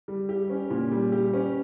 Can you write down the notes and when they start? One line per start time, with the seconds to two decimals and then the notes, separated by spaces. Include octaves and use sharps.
0.08 G3
0.29 G4
0.50 C#4
0.70 A#2
0.92 G3
1.12 G4
1.34 C#4